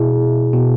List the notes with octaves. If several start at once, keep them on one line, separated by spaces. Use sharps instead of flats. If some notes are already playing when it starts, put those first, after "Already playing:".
Already playing: B2 E4 G#4
B2